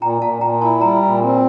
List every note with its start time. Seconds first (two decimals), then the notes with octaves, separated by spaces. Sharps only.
0.02 A#2 G5 A#5
0.22 A#2 F5 A5
0.41 A#2 G5 A#5
0.61 E4 A5 C6
0.81 G3 G5 A#5
1.02 A#2
1.22 C4